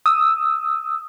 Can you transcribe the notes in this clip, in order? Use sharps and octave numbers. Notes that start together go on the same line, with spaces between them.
D#6 E6